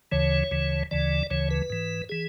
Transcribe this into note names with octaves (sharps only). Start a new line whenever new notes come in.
D2 C#3 E3 C#5
D2 C#3 E3
D2 C#3 E3 D5
D2 C#3 E3 C#5
B4
G#2 E3
E3 G#4